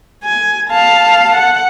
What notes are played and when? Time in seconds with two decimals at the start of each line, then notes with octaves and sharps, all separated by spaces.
0.24 G#5
0.70 F5 A5
1.36 F#5